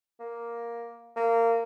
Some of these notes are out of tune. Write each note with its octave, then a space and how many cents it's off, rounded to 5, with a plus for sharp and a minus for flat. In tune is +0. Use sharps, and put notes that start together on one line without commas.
A#3 +5
A#3 -20